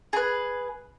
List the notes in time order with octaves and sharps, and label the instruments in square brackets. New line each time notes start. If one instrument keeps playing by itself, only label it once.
[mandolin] G#4 B4